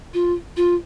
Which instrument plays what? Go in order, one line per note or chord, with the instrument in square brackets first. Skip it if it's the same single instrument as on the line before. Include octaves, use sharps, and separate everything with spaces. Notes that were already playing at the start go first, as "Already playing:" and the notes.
[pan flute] F4
F4